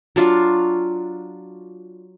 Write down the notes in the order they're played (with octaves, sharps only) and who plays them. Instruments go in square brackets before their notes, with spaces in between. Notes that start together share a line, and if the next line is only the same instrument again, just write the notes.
[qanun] F#3 D4 F4